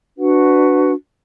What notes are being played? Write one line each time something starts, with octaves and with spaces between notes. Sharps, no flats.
D4 F#4 B4 F#5